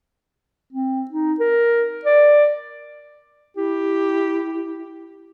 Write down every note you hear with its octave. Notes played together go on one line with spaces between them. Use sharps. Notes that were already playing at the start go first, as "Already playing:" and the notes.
C4
D#4
A#4
D5
E4 G4